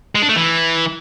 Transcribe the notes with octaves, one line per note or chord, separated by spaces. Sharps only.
G#3
D4
A3
E3